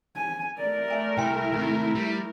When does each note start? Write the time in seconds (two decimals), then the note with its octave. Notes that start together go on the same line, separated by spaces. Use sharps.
0.16 G#5
0.58 A3 A#4 D5
0.88 E5 G#5 A#5
1.18 C2 E4 G5 G#5 C6
1.53 D#2 C3 D#4
1.95 G3